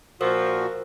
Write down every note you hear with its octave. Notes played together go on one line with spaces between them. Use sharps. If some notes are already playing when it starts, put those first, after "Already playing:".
A#2 F3 F#4 A#4 C5 E6